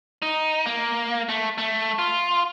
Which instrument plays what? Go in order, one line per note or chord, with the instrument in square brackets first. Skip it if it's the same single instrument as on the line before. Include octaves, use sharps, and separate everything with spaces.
[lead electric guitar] D#4
A#3
A3
A3
F4